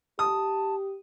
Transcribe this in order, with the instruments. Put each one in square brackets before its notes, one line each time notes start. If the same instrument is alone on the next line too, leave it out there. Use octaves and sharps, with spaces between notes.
[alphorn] G4 [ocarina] A5 [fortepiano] D#6